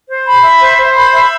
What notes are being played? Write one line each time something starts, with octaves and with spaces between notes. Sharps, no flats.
C5
B5
E5
C5
C5
B5
E5